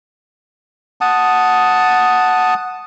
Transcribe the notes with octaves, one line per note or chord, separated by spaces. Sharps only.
F#5 A5 D#6